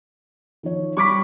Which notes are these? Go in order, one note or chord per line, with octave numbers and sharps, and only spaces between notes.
D#3 F3 C#5
G3 G4 B5 C#6 D6 B6